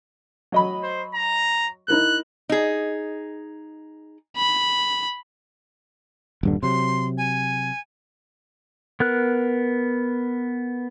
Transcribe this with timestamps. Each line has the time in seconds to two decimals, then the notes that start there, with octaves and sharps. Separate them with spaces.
0.52 F#3 D#5 B5
0.83 C5
1.15 A#5
1.88 D#4 E4 A#4 F#6
2.49 D#4 G#4
4.37 B5
6.43 D#1 G2 D3
6.63 C3 F#3 C6
7.18 G#5
9.00 B3 A#4 F#6